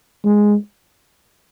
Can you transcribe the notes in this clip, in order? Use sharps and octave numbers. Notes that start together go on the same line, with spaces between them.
G#3